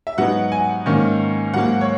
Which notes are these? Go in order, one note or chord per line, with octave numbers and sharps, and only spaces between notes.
E5
G#2 F#3 B3 D#4 F#5
G#5
G#2 D#3 A#3 C#4
G#2 F#3 A#3 F#5
C#5